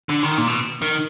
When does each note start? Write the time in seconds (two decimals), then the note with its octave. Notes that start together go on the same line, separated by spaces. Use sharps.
0.09 D3
0.23 D#3
0.38 A#2
0.48 B2
0.82 D#3